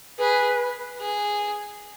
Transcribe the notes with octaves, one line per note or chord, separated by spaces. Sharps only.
G#4 B4
G#4